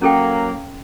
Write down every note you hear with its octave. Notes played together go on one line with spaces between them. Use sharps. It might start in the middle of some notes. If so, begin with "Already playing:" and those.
F#3 A#3 C#4 A4 G5